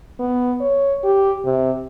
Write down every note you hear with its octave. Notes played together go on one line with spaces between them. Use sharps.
B3
C#5
G4
C3